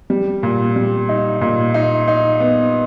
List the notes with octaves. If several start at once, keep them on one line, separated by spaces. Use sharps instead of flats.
G3
A#2
G3
D#4
A#2
D#4
D#4
B3